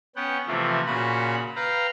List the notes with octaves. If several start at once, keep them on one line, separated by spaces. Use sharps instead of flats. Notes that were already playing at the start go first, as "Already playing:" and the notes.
B3 C#4 F#5 G5
C3 E3 F3 A3
A#2 C#3 F#4 B5
B4 F5 G5 A#5